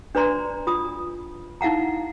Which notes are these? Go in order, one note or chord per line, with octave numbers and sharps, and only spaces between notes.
D4 B4 D5 A#5 C6
F4 D#6
D#4 E4 F5 F#5 A#5